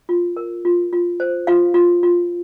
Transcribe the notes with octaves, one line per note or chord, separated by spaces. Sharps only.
F4
A#4
F4
F4
C5
F4 F5
F4
F4